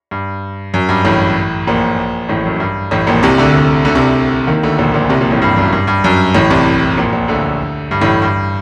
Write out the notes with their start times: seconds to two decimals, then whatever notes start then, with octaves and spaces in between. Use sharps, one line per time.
0.11 G2
0.74 F#2
0.89 G2
1.05 A1 A2
1.67 A#1 A#2
2.29 A1 A2
2.46 F#2
2.60 G2
2.91 A1 A2
3.07 A#1 A#2
3.23 C2 C3
3.38 D2 D3
3.85 D2 D3
3.95 C2 C3
4.47 D#2 D#3
4.63 D2 D3
4.78 A#1 A#2
4.94 A#1 A#2
5.09 C2 C3
5.21 A#1 A#2
5.31 A1 A2
5.42 G2
5.57 F#2
5.73 G2
5.87 G2
6.04 F#2
6.34 A1 A2
6.50 C2 C3
6.97 A#1 A#2
7.12 A#1 A#2
7.28 D2 D3
7.91 G2
8.01 A1 A2
8.22 G2